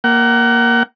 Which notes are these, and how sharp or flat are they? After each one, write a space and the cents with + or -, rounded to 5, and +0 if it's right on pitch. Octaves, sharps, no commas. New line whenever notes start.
A#3 +5 F#5 +35